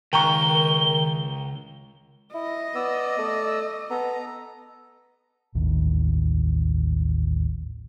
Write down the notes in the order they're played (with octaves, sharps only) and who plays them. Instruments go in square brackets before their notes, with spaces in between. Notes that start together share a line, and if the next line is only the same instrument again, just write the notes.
[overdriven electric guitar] C#2 [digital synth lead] D#3 [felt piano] G5 A#5 C#6 [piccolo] G7
[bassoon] E4 [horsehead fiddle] D#5
[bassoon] B3 [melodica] D5 E6
[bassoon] A3
[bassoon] B3 [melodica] A4 A#5
[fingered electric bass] A1 D#2